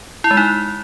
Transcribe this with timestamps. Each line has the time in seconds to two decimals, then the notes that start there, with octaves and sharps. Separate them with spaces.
0.24 E4
0.31 G#3
0.37 D#4